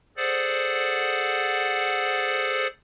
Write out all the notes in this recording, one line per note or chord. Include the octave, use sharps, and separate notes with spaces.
G#4 A4 C5 D5 F#5